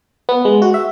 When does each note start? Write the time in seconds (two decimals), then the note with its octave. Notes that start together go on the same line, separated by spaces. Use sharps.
0.29 B3
0.45 G#3
0.62 F#4
0.74 E5